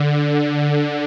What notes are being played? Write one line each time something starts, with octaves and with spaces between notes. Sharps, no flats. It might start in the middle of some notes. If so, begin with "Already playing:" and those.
Already playing: D3